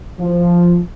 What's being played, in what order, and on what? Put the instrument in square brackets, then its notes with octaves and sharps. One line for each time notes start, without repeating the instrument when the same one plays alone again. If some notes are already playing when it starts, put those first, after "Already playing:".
[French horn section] F3